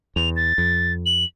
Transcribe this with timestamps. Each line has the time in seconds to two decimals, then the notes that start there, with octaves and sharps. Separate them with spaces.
0.16 E2 F7
0.36 A6
0.58 F2
1.06 F#7